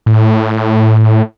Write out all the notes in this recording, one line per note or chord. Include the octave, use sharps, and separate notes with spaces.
A2